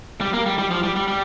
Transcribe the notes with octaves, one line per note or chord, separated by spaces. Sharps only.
G3
A#3
G3
G3
F3
G3
G3
G3